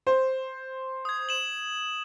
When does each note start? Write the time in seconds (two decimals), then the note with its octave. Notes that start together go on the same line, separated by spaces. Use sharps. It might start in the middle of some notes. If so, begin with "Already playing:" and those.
0.07 C5
1.05 D#6 G#6
1.29 E7 F#7